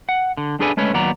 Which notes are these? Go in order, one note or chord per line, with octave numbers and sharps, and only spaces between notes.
F#5
D3
D4 G#4 A4 B4 D5 G#5
G#3 A3 C#4 B4 C#5
D#2 F#3 B3 D5 A#5